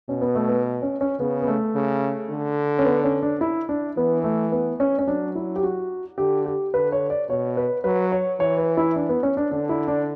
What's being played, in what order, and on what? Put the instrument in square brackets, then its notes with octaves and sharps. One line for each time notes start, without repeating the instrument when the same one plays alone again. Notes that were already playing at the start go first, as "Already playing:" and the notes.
[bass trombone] B2 [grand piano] C#4
[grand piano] B3
A3
B3
C#4
C#4
[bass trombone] C#3 [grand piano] B3
[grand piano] B3
A3
[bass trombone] C#3
D3
[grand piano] C#4
B3
C#4
D4
E4
D4
[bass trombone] E3 [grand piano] B3
[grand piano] A3
B3
C#4
C#4
[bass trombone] F#3 [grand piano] D4
[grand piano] E4
G4
F#4
[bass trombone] D3 [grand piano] G4
[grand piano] G4
[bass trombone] D3 [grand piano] B4
[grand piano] C#5
D5
[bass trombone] B2 [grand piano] C#5
[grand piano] B4
[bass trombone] F#3 [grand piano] B4
[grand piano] C#5
[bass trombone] E3 [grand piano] C#5
[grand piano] B4
E4
D4
B3
C#4
D4
[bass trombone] D3 [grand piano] D4
[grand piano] E4
D4